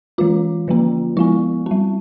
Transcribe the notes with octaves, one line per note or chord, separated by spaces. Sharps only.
E3 G#3 C#4 F4
D3 F3 A#3 C#4
F3 G#3 B3 E4
G3 C4